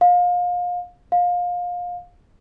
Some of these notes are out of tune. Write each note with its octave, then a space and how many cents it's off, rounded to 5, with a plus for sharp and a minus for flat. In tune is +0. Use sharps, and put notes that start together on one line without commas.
F5 +30
F5 +25